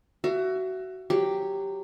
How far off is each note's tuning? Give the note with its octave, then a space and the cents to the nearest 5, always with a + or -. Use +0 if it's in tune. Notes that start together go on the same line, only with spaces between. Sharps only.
F#4 +20 E5 +30
F#3 +0 G4 +0